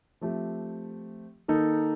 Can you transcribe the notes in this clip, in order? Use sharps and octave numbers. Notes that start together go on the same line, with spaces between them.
F3 A3 C4 G4
D#3 A#3 D#4 A4